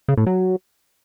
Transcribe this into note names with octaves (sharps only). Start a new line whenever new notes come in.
C#3
A2
F#3